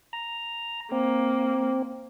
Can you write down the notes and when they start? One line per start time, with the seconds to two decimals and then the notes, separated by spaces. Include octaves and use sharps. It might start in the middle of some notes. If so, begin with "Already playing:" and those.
0.13 A#5
0.92 A#3 C4